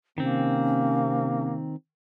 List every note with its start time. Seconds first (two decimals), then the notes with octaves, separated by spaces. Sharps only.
0.18 C3 D#3 A#3 C4 C#4